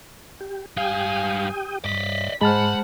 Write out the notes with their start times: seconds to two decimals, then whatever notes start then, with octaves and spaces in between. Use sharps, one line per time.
0.41 G4
0.77 G2 G4 F5 G5 G#5 D#6
1.84 G2 D5 D#5 B6
2.41 G#2 G#3 C5 F#5 A5 B5 F6